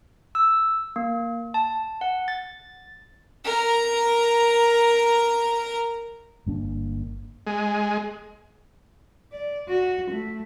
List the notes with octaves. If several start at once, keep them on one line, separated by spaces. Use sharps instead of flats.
E6
A#3
A5
F#5
A6
A#4 A#5
G1 A#3 D4
G#3
D5
F#4
A3